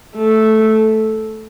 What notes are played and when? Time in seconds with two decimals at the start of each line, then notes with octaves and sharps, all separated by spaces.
0.16 A3